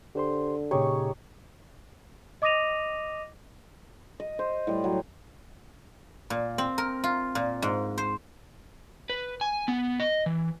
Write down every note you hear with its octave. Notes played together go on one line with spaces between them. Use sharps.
D3 G4 C5 C6
A#2 C#3 D#4 G4 G#4 C#5
D#5 D6 D#6 A#6 D#7 F7
D#5
C5
A2 G3
F#3
A#2
C4
A#4
F4
A#2
G#2
C5
B4
G#5
B3
D#5
E3